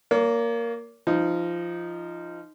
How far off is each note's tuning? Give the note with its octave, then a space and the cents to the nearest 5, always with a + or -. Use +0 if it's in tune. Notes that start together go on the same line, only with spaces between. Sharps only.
A#3 +0 C#5 +40
F3 -15 D#4 +0